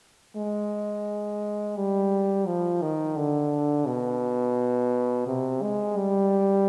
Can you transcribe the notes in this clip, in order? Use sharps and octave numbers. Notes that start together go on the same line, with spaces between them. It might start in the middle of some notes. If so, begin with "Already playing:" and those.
G#3
G3
F3
D#3
D3
B2
C3
G#3
G3